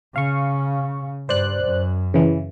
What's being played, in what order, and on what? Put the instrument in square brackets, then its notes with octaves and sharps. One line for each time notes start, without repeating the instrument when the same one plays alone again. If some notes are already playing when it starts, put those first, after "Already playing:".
[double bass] C#3 [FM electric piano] F5 C#6
[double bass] G2 [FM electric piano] C5 D5 F#6
[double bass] F#2
[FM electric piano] C#3 E3